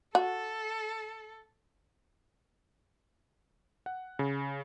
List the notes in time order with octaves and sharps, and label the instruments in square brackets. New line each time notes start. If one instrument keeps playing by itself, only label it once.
[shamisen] F#4 [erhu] A4
[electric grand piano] F#5
C#3